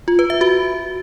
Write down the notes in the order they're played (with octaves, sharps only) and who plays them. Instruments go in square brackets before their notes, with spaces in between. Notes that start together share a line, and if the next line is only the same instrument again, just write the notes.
[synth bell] F4
B4
E5
F#4